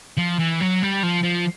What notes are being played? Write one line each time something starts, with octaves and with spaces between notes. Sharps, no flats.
F3
E3
F#3
G3
F3
F3